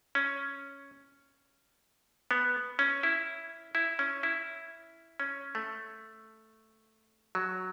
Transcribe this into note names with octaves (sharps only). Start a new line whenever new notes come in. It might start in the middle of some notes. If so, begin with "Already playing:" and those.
C#4
B3
C#4
E4
E4
C#4
E4
C#4
A3
F#3